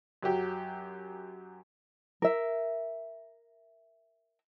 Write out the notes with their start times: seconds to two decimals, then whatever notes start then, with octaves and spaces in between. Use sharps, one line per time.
0.23 F#2 F#3 G4
2.22 A#4 E5